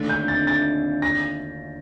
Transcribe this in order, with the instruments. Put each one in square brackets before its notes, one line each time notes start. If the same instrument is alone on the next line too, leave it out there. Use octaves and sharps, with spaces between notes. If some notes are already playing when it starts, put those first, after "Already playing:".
Already playing: [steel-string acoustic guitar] D#2 D3 A3 D4 F4
[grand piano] G6
A6
A6
A#6